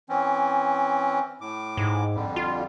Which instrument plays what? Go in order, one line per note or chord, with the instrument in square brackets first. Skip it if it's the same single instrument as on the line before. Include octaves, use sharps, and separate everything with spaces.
[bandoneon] E3 C4 C#4
A2 D6
[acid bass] G#2
[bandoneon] F2 D3 G3
[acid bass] F4